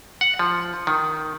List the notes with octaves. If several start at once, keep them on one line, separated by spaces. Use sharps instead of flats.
F#5
F3
D#3